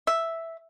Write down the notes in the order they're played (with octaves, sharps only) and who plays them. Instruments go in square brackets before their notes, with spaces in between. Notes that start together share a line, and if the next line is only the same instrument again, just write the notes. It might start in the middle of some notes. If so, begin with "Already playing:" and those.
[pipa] E5